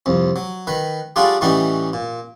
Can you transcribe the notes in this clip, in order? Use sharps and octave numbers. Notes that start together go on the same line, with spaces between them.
C2 F2
F#3
D#3 B4
G3 D4 F4 F#4 G#4 A4
A2 E3 G3 C#4 D#4 F#4
A#2